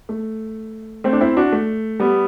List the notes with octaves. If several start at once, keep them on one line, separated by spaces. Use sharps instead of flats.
A3
A3 C4
D4
C4 E4
D4 F#4
A3
G3 B3